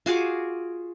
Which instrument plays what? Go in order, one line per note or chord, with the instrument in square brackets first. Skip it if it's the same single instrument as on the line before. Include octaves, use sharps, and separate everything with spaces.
[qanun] F4 F#4 G#4 D6